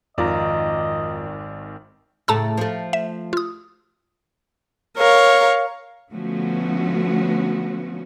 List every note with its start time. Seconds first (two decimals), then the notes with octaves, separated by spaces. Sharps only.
0.18 G#1 F2 D#3 F4 D5 D#5 A#5
2.28 A2 C#3 A3 A5 A#5 E6
2.57 F3 A3
2.93 E5
3.33 F4 D#6
4.97 A#4 C#5 F5
6.12 D3 F3 A3 B3 C#4 F#4